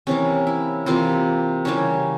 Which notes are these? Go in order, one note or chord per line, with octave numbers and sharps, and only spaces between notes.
C3 E3 A#3 C#4
E4
C3 E3 A#3 F4
C#3 E3 G3 A#3 C#4